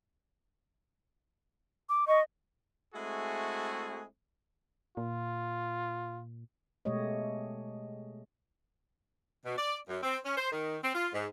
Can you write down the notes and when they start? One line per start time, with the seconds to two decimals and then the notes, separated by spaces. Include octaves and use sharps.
1.89 D6
2.07 D#5 C#6
2.95 G#3 A3 C4 E4 F#4 G#4
4.97 A#2 F4
6.85 B2 G#3 A3 G4 C#5 D#5
9.45 B2
9.57 D5
9.89 F#2
10.03 C4
10.25 C#4
10.38 C5
10.51 D#3
10.82 C4
10.94 F4
11.13 G#2